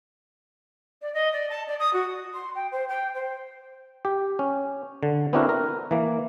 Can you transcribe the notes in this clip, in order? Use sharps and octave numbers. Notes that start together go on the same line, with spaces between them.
D5
D#5
D5
A5
D5
D#6
F#4
C6
G5
C5
G5
C5
G4
C#4
D3
B3 C4 D4 E4 F#4 A#4
A#4
E3 A#3